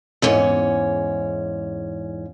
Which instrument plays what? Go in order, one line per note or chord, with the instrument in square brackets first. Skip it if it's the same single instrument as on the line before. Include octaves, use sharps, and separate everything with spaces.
[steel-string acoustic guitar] E2 G#2 C#4